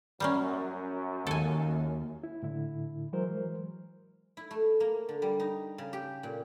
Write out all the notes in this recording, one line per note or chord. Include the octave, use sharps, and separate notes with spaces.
F#2 G3 A#3 C#4
D#2 A4 G#5
E4
A2 D3 E4
E3 F#3 G#3 A#4 C5
E4
A3
A#3
D3
G3
D#4
C#3
G4
A#2